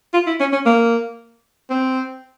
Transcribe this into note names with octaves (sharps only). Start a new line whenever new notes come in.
F4
E4
C#4
C#4
A#3
C4